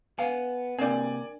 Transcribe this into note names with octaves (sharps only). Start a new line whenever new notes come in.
B3 F5 G#5
C3 A#3 C4 D4 A#4 D5 G#5